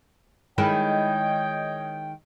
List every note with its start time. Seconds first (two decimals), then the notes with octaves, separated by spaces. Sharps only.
0.58 D#3 G#3 E4 C#5 D#5 G5